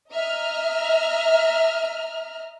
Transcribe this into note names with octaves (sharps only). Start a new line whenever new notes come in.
D#5 E5 A#5 F6